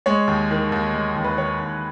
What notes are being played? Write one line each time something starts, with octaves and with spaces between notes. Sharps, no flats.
G#3 C#5
D#2
D#3
D#2
G#3
D#2
B4
D#3 C#5
D#2